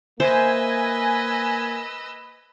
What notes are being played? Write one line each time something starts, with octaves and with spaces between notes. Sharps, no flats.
A#3 B4 C5 D#5 E5 G#5 E6